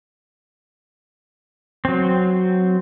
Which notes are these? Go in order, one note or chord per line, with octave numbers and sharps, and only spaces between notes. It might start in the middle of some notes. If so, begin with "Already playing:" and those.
F#3 C4